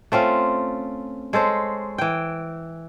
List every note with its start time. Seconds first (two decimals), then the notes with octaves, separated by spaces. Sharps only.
0.12 A3 C4 C#4 F4
1.33 G#3 A4 C5 C#5
1.98 E3 G5